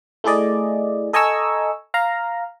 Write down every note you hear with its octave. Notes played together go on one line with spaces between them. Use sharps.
A3 E4 G#4 D5 D#5
A4 D#5 G#5 A#5 C#6 E6
F5 A#5